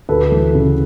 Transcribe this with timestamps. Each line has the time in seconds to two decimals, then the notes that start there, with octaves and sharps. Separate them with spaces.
0.09 D2 A4 B4
0.32 E3
0.55 C#3